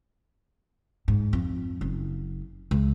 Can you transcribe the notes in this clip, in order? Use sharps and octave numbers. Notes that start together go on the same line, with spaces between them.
G#2
F2
F#1
C#2